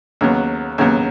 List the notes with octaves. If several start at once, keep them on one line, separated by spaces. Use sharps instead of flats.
D#2 C#3 F#3 B3
D#2 C#3 F#3 B3